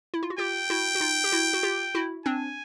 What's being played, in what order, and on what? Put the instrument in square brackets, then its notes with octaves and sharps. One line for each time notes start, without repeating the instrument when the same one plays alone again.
[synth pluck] E4
F4
F#4
[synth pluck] F4 G4 [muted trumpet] G5
[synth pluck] E4 F#4
F#4
D#4 F4
G4
E4 F#4
F#4
F4 G4
E4 F#4
[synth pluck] C4 D4 [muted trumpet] G#5